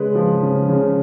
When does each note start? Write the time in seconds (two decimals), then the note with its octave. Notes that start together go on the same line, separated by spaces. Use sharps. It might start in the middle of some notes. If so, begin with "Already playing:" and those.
Already playing: C#3 G#3 B4
0.15 F3
0.42 C#3
0.69 C#3